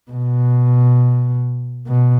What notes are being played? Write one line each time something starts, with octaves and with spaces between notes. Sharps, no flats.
B2
B2